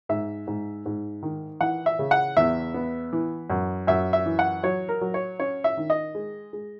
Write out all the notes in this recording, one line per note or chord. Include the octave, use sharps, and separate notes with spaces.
G#2 E5
G#2
G#2
D#3
E3 F#5
E5
C#3
F#5
E2 E5
B3
E3
F#2
F#2 E5
E5
E3
F#5
F#3 C#5
A#4
F#3
C#5
C#4 C#5
E5
D#3
D#5
G#3
G#3